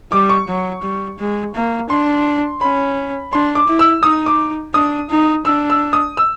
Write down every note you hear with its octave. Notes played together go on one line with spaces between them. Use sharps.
G3 D6
C#6
F#3
G3
G#3
A#3
D4 C6
C#4 B5
D4 C6
D6
E4
E6
D#4 D#6
D6
D4 D#6
D#4
D4 E6
E6
D#6
E6